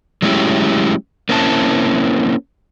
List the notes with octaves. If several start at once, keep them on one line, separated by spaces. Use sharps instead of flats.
F#3 G#3 A3 C#4 E4 G4
A#3 C4 C#4 E4 A5